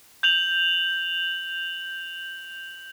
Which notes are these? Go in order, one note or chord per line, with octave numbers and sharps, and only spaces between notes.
G6 F7 F#7